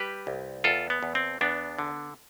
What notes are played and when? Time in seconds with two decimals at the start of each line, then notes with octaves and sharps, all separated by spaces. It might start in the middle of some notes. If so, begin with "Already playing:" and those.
Already playing: G3 G4 B4
0.27 C2
0.64 E2 F4 A4
0.90 B3
1.03 E2
1.15 C4
1.41 E2 B3 D4
1.79 D3